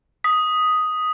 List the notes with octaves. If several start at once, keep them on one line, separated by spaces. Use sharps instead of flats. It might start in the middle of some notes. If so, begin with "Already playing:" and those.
D#6 B6